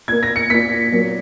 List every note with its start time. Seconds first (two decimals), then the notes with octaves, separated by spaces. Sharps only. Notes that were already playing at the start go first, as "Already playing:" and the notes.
0.08 A#2 G#6
0.12 A#3
0.23 A#6
0.36 C#7
0.50 A#2 A#3 B6
0.92 A#2 F#3 A#3